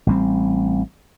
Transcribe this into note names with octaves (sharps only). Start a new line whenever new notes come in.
A1 G3 C4